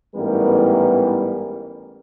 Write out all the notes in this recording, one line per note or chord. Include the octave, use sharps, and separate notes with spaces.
A1 G#2 E3 G3 B3 A#4